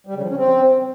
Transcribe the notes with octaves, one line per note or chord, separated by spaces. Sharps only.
G3
C#3
F3
C#4
C4